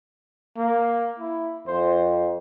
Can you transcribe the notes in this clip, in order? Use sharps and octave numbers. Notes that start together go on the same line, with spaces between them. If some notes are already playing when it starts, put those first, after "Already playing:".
A#3
E4
F2 C5